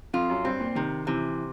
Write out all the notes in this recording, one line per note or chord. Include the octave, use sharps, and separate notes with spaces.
F2 F4
F#2
G2 C4
A#2
C3 D#3
C3 E3